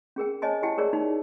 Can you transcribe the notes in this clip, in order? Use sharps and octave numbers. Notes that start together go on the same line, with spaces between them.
C#4 G#4 A#4 G5
C5 C#5 D#5 G#5 A5
E4 G4 F#5 G5 A5
G#4 A#4 C#5 D5
D#4